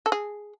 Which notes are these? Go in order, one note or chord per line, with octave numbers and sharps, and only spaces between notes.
A4
G#4